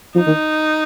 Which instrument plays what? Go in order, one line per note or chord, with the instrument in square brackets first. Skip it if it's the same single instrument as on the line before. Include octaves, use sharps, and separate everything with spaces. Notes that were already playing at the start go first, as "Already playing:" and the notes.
[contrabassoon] F3 [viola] D#4
[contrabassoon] D#3